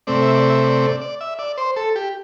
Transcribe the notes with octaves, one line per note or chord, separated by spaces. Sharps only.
C3 A3 C4 D5
E5
D5
E5
D5
D5
D5
E5
D5
C5
A4
G4